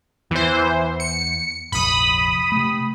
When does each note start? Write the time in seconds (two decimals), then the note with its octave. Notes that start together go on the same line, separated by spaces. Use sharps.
0.31 E2 E3 C5
1.00 C#7
1.72 F1 A#1 B5 D#6
2.52 C3 A3